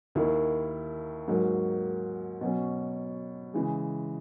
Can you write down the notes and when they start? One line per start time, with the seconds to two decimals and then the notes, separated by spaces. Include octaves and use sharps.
0.15 D#2 D#3 A#3 E4
1.28 G#2 F#3 A#3
2.41 B2 F#3 C#4
3.54 C#3 E3 G#3